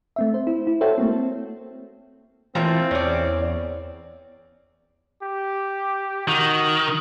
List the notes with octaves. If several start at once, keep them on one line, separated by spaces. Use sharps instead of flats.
A3 C4 E5
C5
E4
E4
F#4 A4 C5 C#5 E5 G5
A3 A#3 C4
E3 A3 A#3 C4 F4
E2 C#4 D5
G4
D#3 F#4